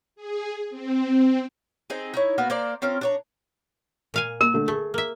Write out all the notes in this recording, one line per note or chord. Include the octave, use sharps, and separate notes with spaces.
G#4
C4
C4 D#4 G#4
D#4 E4 C#5
A#3 B3 F#4 B4
A#3 C5 D5 A#5
C4 C#4 F4 A#4
D4 C#5 A#5
A#2 F5 G#5
A#3 A#4
D3 A3
A3 G#4
A#3 E5